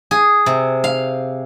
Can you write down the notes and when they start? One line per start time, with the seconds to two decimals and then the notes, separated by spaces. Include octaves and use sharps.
0.11 G#4
0.46 C3
0.84 F5